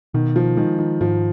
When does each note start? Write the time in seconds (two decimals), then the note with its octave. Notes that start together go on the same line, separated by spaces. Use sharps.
0.14 B2 D#3
0.36 F3
0.57 D#3 G#3
0.78 D#3
1.01 G#2 F3